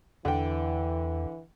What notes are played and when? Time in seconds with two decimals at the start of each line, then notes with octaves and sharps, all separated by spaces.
0.25 E2 D3 E3 G5